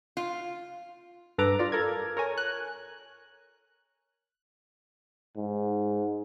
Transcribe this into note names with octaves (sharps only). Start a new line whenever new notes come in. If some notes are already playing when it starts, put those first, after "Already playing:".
F4
G2 A4 B4 A#5 D6
F4 D5
A4 A#4 G#6
A#4 C#5 G#5
F#6
G#2